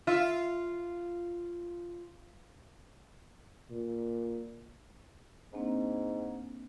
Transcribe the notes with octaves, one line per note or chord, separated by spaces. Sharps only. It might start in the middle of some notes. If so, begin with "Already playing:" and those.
F4 E5
A#2
G#2 A#3 C4 D4